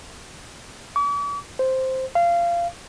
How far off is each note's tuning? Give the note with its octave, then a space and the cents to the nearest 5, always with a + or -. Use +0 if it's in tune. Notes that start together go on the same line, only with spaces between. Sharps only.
D6 -45
C5 +0
F5 -20